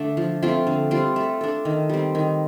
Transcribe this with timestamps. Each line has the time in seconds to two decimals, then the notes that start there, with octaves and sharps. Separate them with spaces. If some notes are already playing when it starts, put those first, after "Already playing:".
Already playing: D3 A3 D4
0.17 F3
0.42 A3 C4 F4
0.67 D3
0.91 G3 C4 F4
1.16 A3
1.41 D4 A4
1.65 D#3
1.90 G3 C4
2.15 D#3